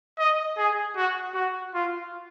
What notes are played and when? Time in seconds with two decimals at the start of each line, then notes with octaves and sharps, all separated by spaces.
0.19 D#5
0.57 G#4
0.97 F#4
1.34 F#4
1.74 F4